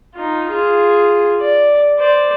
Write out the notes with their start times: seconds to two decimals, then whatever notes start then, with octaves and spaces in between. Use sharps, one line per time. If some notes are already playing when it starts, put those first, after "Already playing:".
0.15 D#4 F4
0.48 F4 G#4
1.41 D5
1.99 C5 D5